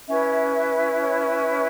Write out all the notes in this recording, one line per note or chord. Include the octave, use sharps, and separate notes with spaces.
C#4 E4 B4 E5
E5
E5
E5
C#5
C#5